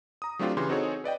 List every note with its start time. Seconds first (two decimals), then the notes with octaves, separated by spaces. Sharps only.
0.22 A#5 D#6
0.39 F#3 A3 C4 D4 F4 G4
0.57 C#3 E3 G4 C6
0.69 C4 D#4 F#4 G#4 A4 C#5
1.04 B4 D5 D#5 G5